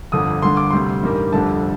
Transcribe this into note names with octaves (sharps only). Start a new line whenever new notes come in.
G1 F2 D3 D#6
G1 G2 D3 C6
D6
D2 C3 G3 C6
A1 G2 D#3 G3 A#3
F1 F2 D3 G3 D4 A5